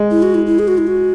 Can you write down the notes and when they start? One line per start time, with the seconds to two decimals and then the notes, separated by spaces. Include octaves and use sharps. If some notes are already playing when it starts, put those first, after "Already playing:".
Already playing: G#3
0.11 E4
0.23 F#4
0.35 E4
0.46 E4
0.59 G#4
0.68 F#4
0.78 E4
0.87 F#4